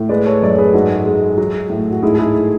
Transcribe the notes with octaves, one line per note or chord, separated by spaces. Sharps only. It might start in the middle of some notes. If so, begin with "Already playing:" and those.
Already playing: A2
G#3 B4 D5
A4 C#5
F#2 D5
C#5
G#4 B4
G#2 F#4 A4
G#3
F#3
A2
F#4
G#2 E4 G#4
A4
E4 G#4
E4